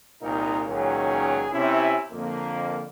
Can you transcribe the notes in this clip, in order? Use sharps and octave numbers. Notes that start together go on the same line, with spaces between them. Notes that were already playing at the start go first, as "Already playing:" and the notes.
C2 A#2 D#4 A#4
C#2 A#2 D#3 F#3 C#4 G#4
C3 C#4 E4
F2 D3 A#3